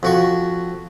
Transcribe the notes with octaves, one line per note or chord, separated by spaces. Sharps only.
F2 F#4 C#6